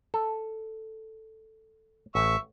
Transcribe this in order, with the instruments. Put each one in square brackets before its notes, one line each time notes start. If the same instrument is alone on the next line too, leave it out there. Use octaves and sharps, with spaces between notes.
[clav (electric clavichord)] A4
[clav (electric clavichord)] A1 [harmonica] E5 C#6